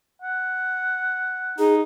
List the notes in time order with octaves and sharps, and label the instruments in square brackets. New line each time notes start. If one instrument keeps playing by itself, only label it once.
[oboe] F#5
[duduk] D#4 [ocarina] G#4